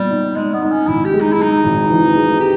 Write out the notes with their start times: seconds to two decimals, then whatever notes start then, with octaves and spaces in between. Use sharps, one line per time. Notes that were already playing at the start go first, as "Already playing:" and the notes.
Already playing: A#2 G3 B3
0.10 D#4
0.36 G#3 D#4
0.54 B3
0.62 D#4
0.71 C#4
0.88 G#1 E4
1.05 G4
1.13 G#3
1.21 D#4
1.32 E4
1.38 G#3 D#4
1.64 G#1
1.90 E3
2.15 G#3
2.40 G4